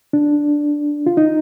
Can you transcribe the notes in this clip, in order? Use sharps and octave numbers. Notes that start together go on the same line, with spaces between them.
D4
F4
D#4